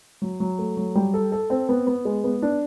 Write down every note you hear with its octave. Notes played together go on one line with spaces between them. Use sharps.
F#3
F#3
A3
F#3
G3
A4
A4
C4
B3
B3
G#3
B3
D4